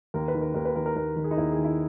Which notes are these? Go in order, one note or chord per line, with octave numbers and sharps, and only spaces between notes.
D#2 A#4
B4
D#3
A#4
D#2 A#4
B4
D#3 A#4
A#4
D#2 A#4
D#3
G#4
D#4
D#2 E4
G#4
D#3
E4